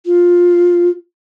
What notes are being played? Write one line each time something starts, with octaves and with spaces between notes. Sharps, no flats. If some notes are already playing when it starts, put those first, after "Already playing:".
F4